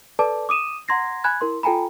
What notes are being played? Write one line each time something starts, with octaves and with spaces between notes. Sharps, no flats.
A4 B4 D5 A5 D6
D6 D#6 D#7 E7
F#5 A#5 C6 G#6 A#6 C7
G#5 B5 F#6 G#6
E4 A#4 C6
F4 A4 G5 G#5 A#5 B5